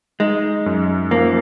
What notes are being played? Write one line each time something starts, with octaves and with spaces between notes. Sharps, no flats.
G#3 D#4
F#2
F3 A#3